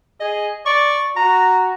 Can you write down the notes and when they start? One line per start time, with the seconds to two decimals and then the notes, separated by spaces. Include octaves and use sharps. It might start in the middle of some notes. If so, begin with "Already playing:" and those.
0.20 G#4 D#5
0.66 D5 C#6
1.17 F#4 A#5